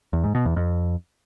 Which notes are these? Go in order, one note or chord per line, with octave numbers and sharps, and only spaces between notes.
E2
G#2
B2
E2
F2